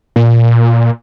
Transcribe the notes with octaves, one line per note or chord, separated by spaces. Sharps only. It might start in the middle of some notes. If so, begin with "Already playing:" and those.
A#2